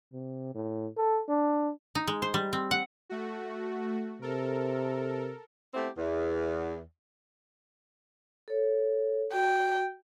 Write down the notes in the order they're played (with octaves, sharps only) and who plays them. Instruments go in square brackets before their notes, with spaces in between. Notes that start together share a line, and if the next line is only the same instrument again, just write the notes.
[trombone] C3
A2
A4
D4
[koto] D#4
G#3
C5
G3
C4
F#5
[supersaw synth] A3 F#4
[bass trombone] C3 [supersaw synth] A4 A#4
[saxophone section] A3 B3 C4 E4 G4
E2
[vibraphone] A4 C#5
[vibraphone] F#4 [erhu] G5